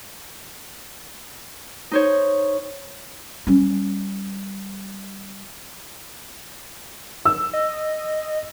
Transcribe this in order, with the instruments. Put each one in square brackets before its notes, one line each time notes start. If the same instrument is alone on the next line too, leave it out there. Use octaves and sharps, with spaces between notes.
[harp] D#4 C5 C#5
[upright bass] G3 C#4
[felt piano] E6
[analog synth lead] D#5